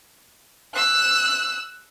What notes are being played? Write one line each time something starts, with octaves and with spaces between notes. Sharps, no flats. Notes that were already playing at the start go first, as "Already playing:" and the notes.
E6 F#6